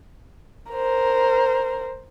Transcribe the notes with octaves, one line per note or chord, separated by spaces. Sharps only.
A#4 C5